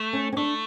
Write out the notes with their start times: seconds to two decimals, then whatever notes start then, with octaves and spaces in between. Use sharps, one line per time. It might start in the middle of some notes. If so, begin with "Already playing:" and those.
Already playing: A3
0.13 C#4
0.33 C#4
0.37 A3 D4